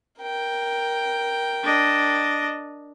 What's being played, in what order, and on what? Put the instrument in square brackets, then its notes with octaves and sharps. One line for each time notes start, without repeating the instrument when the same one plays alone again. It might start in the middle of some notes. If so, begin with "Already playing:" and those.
[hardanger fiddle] A#4 G5
[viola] D4 D#5